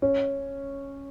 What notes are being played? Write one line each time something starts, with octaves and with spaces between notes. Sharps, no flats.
C#4